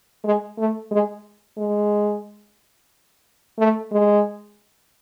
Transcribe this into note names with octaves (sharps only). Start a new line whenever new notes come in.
G#3
A3
G#3
G#3
A3
G#3